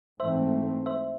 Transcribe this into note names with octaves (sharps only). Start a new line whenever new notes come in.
G#2 E3 A3 C4 C5 E5
C5 E5